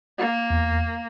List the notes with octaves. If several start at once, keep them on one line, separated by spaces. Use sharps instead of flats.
A#3
E2